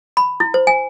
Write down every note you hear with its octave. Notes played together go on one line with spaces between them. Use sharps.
B5
E4
C5
G#5